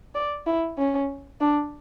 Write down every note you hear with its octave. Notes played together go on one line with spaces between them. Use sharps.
D5
E4
C#4
D4